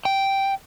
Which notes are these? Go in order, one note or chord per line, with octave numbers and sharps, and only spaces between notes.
G5